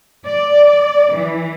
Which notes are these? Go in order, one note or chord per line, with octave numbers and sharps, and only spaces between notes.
D5
E3